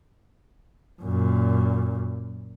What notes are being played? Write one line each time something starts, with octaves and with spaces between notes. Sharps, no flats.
F#2 A#2